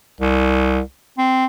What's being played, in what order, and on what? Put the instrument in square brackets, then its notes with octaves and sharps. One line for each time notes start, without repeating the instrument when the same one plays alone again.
[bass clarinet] C2
C4